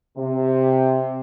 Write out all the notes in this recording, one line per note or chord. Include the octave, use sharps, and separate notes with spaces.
C3